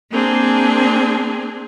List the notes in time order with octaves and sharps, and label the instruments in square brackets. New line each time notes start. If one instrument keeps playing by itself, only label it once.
[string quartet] A#3 C4 D4 G#4